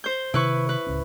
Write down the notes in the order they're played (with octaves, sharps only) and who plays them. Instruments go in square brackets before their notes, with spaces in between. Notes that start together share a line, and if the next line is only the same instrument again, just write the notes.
[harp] C5 G6
[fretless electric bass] C3 D#3 C4 [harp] E4 B4 C#6
[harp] B4
[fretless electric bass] D1 C#2 C#4